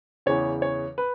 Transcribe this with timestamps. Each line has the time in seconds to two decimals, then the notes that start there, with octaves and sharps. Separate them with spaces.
0.26 E2 C#3 E3 C#5
0.62 C#5
0.98 B4